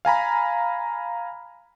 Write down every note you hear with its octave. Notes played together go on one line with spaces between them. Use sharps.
F5 G#5 A#5 B5